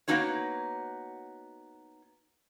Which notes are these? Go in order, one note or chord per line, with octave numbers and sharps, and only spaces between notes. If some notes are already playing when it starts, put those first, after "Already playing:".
A#3 B3 C#4 D#4 F#4 C#5